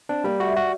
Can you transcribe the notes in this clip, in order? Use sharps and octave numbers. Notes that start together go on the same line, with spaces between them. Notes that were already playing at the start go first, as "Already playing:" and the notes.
C4 D4
G3 A#3
A3 F#4
G3 F#4